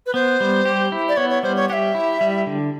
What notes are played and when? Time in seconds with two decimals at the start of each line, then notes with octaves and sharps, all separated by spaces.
0.06 B4
0.14 B3 C5
0.40 G3
0.65 G4
0.92 E4
1.08 D5
1.17 B3 C#5
1.30 C#5
1.43 G3 C5
1.56 C#5
1.69 G4 E5 F#5
1.95 E4
2.21 G3
2.47 D3